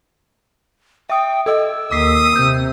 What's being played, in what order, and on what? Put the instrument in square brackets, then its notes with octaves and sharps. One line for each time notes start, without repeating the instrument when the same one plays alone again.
[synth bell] E5 D#6 [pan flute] G5
[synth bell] A4 D#5 [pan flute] E6
[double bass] D#2 [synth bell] D6 B6 C7 [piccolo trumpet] D#6
[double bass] C3 [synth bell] G6